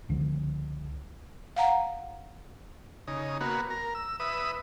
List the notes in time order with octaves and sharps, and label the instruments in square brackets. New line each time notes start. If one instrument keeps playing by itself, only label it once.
[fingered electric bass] C#2 D3 F3
[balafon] F5 F#5 A#5
[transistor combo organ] C#3 D#4
A#3 B3 F#4
A#4
E6
B4 E5 D#6